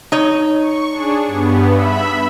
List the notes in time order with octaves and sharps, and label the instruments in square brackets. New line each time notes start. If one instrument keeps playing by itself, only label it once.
[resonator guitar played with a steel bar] D#4 C#5
[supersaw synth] C#6
D4 G#4
G2 B3
E5 B5